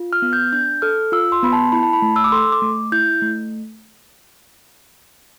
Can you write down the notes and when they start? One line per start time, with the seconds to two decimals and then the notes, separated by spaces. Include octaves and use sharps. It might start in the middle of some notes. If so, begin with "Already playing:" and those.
Already playing: F4
0.13 F6
0.22 B3
0.33 G6
0.53 D4 G6
0.82 A4 F6
1.12 F4 E6
1.32 C6
1.43 B3 B5
1.53 A5
1.72 E4 B5
1.83 A5
1.93 B5
2.02 A3
2.16 E6
2.24 D6
2.32 A4 C6
2.52 D6
2.62 A3
2.92 E4 G6
3.22 A3